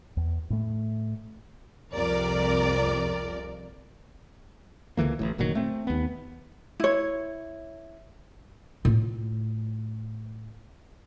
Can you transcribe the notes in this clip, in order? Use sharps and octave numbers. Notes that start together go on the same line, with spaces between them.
E2
A2 A3
C2 F2 A#4 D5
C#2 D3 E3 A#3
A1 A2
F#1 A#2 D#3 F#3
A3 C4
D#2 B3
E4 C#5
A2 F4